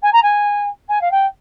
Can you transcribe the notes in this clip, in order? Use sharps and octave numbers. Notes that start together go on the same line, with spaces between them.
G#5
A#5
G#5
G#5
F5
G5